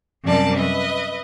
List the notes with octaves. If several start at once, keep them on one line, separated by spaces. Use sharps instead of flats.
F#2 C3 G3 A#4 D5 A5
B4 D#5 E5